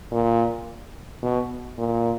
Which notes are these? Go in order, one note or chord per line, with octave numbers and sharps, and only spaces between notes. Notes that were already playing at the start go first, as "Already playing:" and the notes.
A#2
B2
A#2